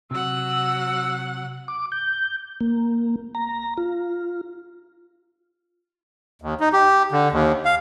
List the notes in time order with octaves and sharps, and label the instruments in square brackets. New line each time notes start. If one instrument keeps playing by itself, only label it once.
[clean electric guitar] C3 [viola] F#3 F#5 [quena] E6
[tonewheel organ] D6
G6
A#3
A#5
F4
[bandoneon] D#2
D#4
G4
D3
D#2
F5